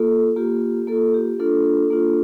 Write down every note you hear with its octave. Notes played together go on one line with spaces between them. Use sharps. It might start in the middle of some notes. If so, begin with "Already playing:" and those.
Already playing: A#3 F4 A4
A#3 F4 G4
A#3 F4 A4
G4
A#3 D4 F4 A4
A#3 D4 F4